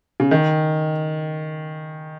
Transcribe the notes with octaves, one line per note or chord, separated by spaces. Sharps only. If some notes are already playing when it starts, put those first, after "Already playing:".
C#3
D#3